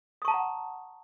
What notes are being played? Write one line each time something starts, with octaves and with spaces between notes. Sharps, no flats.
F#5 A5 A#5 C#6 D#6